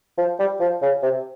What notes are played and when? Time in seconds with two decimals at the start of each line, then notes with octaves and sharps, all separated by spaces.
0.18 F3
0.39 G3
0.60 F3
0.82 C#3
1.02 C3